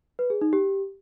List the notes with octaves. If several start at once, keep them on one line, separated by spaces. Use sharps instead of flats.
B4
G#4
D#4
G4